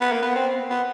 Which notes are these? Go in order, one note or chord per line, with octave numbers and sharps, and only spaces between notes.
B3
A#3
B3
C4
B3